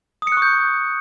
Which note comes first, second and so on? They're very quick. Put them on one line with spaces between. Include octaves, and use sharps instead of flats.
D#6 C#7 F#6 C#6 G6